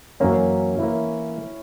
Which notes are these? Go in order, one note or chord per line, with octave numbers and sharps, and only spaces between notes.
F#2 E3 A#3 C#4
E3 A#3 E4